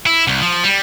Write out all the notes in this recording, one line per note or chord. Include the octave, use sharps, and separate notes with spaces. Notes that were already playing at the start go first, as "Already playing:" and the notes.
E4
C2
F3
G3